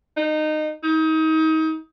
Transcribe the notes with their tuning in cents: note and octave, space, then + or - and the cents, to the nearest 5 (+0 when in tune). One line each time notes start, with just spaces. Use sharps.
D#4 -20
D#4 +30